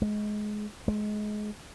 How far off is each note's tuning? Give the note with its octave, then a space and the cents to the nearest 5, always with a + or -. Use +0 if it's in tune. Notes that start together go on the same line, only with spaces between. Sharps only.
G#3 +20
G#3 +25